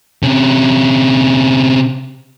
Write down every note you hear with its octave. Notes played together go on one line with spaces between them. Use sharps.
C3 C#4